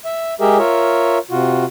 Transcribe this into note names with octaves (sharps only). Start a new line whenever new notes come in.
E5
G#3 G4 G#4 A#4 E5
F4 A#4 C#5 E5
C3 F4 F#4